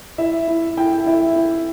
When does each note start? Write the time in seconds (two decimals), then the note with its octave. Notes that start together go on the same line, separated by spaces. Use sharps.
0.18 E4 E5
0.48 E4
0.77 E4 G5
1.06 E4 E5
1.36 E4